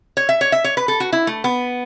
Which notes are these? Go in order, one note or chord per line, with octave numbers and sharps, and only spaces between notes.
C#5
E5
C#5
E5
C#5
B4
A4
F#4
E4
A3
B3